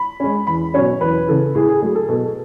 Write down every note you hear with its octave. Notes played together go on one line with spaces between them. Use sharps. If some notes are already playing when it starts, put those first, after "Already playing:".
Already playing: B5
G#3 C#4
E2 B5
B2 F#3 C#4 C#5
E2 B4
C#3 E3 A4
A2 G#4
G#4
F#3 A3 G#4
A4
B2 A4